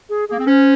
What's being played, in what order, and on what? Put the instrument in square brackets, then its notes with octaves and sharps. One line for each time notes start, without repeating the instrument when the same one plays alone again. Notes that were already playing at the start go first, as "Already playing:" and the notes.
[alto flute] G#4
[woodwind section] A#3 [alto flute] G#4
[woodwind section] C4
[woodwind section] C#4 [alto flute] C5